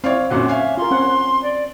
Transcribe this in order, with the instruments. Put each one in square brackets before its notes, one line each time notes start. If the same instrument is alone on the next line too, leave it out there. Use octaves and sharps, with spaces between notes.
[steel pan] C4 E4 [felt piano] C#5 D5 F5
[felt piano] F#2 A#2 D3 [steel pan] C#4 F#5 [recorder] F#4
[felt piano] C#5 F5 G#5 [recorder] E5
[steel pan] F4 A#4 [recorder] C6
[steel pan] C4 C#4 F#5
[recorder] D5